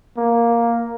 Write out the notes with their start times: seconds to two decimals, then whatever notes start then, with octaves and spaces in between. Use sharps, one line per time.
0.17 A#3